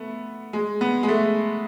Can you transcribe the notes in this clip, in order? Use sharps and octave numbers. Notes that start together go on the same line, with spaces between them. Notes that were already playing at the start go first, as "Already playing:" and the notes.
Already playing: A3 B3
G#3
B3
G#3
A3